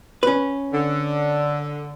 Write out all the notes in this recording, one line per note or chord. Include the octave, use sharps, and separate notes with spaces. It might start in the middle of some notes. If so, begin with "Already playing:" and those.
C#4 B4
D3